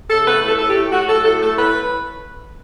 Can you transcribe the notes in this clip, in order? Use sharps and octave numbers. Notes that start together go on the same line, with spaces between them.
C#3 A4
A3 B4
A2
A4
A2 A4
G4
A3
A3 F#4
F#3 A4
A2 A4
A3 A4
A2 B4